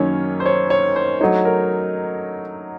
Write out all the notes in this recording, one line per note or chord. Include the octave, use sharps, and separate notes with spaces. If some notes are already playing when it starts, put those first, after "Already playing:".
Already playing: F#2 D#3 A#3 C#4 C#5
C5
C#5
C#5
C5
F#3 A3 D#4 C#5
A#4